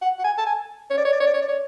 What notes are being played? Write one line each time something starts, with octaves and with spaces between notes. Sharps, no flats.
F#5
F#5
G#5
A5
G#5
C#5
D5
C#5
D5
C#5
D5
C#5
D5
C#5